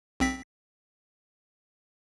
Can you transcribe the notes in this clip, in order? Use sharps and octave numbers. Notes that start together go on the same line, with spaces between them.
B1 C4 B6